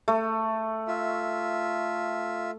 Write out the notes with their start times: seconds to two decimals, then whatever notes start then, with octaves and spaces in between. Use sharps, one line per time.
0.08 A3
0.88 F4 E5